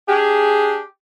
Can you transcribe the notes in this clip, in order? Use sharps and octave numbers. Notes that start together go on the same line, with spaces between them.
D4 G4 G#4